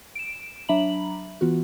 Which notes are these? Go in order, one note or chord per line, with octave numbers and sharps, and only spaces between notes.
D7 E7
F#3 D4 E5 A#5 B5 F#7
E3 B3 F4 F#4